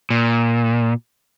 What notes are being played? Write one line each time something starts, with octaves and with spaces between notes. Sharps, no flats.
A#2